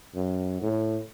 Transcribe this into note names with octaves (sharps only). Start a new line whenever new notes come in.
F#2
A2